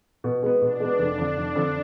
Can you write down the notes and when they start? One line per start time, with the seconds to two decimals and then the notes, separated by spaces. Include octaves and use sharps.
0.24 B2
0.43 G#3 B3
0.61 B2 D4
0.80 G#3 B3
0.99 F1
1.18 F2 D3
1.37 F1
1.55 F2 D3